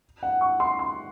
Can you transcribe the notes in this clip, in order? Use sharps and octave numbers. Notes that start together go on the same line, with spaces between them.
F#5
C#6
C6
C6